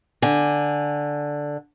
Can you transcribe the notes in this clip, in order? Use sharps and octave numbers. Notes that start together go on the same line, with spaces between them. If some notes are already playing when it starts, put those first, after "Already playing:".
D3 G#5